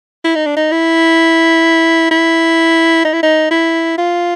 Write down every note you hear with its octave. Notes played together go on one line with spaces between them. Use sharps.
E4
D#4
D4
D#4
E4
E4
D#4
E4
D#4
E4
F4